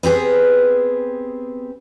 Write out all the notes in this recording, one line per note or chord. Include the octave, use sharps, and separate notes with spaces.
B3 C4 G4 G#4